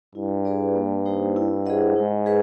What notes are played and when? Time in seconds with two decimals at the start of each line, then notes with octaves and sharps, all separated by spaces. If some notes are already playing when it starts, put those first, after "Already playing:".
0.15 G2 E4
0.45 G#4 B4 D5
0.75 A#3
1.06 D#4 G4 C5
1.36 E4
1.66 G#4 C5 D#5 F#5
1.96 G#2 D#4
2.26 G#4 B4 D#5